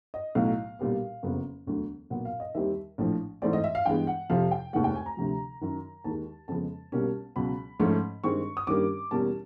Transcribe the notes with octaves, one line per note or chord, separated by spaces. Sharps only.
D#5
B1 A2 F#3 F5
B1 A#2 G3 B3
F#1 F2 C#3 F#3 B3
E1 D2 D3 F#3
B1 A#2 F#3 B3 F#5
F5
D#5
D#2 D#3 G3 C4 E5
A#1 A2 F3
G#2 E3 A3 C4 D5
D#5
E5
F5
G2 E3 G#3 B3 G5
F#5
F2 C3 F3 F5
G5
F1 D#2 D#3 G#3 F#5
G5
G#5
A#5
D2 C3 F3
F#2 D#3 F#3
D#2 D#3 G#3 A5
F2 C#3 F3 G#3 B3 A5
B1 B2 G3 A#3 C#4
C#2 B2 F#3 B5
G#2 F3 A3 C#4
G2 D#3 G#3 C4 C#6
D#6
G2 D#3 G3 A#3 C#4 D6
E2 B2 G3 A#3 C#4 A5